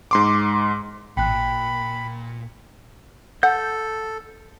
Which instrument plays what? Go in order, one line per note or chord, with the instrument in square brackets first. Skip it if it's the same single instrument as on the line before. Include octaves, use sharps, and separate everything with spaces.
[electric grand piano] G#2 C6 D6
[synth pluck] A1 [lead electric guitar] A#2 [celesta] G5 F#6 [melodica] B5
[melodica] A4 [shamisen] F#5 [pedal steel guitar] G6